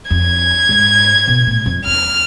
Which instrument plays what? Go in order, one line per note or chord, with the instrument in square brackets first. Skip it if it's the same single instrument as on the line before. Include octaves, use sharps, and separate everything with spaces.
[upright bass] F2 [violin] G#6
[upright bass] G#2
B2
A2
F2
[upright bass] E2 [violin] F6